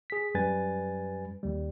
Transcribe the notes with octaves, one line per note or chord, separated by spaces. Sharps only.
G#4 B6
F#2 G3 B4 G#5 A6
D#2 G3